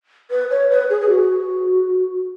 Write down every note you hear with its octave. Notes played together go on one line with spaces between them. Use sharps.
B4
C#5
B4
G#4
G#4
F#4